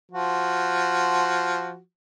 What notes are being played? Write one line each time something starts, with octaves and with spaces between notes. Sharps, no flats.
F3 F#4